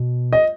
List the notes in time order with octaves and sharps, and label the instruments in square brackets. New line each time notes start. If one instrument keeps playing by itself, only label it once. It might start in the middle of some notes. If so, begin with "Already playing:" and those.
Already playing: [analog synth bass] B2
[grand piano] D#5